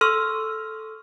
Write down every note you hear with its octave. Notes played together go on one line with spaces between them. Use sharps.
A4 C6 C#6 E6 F6